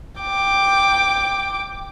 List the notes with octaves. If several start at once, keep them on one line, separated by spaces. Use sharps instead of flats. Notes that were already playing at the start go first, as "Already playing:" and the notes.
G5 D6